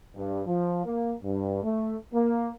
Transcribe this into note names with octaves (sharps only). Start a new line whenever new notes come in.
G2
F3
A#3
G2
A3
A#3